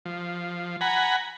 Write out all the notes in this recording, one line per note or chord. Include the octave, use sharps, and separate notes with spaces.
F3
F#5 G#5 A#5 B5